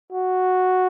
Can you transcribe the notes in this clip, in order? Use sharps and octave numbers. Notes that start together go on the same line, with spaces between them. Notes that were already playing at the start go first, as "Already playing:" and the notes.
F#4